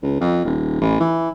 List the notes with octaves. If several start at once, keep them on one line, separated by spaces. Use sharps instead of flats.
C#2
F2
D#1
A1
E3